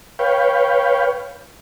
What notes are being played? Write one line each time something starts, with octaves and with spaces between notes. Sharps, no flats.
B4 C#5 F5 G5